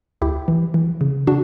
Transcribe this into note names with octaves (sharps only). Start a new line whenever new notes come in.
D2 E4 G4
E3
E3
C#3
C#3 D4 F#4